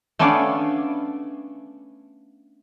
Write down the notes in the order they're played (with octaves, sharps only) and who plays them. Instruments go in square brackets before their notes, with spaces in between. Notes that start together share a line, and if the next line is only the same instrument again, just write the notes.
[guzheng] A3 B3 C#4 D4 D5 F5